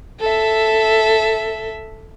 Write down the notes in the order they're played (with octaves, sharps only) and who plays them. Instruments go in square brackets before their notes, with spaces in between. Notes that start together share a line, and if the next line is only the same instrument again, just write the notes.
[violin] A4 E5